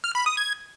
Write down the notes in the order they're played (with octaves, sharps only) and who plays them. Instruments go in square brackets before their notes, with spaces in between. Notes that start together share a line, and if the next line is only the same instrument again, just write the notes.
[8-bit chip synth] F6
B5
D#6
G#6